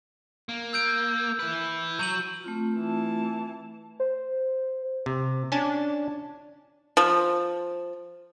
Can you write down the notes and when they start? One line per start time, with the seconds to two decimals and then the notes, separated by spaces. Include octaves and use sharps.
0.49 A#3
0.73 E6 G6 D7
1.39 E4 B4
1.99 F#3 G6 D#7 F#7
2.44 A3 C4 F4
2.77 E3 A5
4.00 C5
5.06 C3
5.52 C#4 D4 G#5 A5
6.97 F3